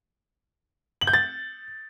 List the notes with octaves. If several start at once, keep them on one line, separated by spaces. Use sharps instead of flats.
F#7
G6
A6